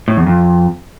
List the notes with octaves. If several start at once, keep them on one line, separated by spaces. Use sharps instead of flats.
A2
E2
F2